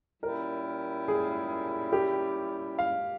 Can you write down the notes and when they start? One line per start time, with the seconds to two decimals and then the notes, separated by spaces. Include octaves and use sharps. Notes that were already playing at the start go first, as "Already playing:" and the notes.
0.22 A#2 G3 C#4 E4 A#4
1.08 G#4
1.93 G4
2.79 F5